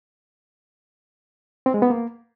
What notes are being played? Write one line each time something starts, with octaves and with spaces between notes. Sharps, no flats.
C4
G#3
B3
A#3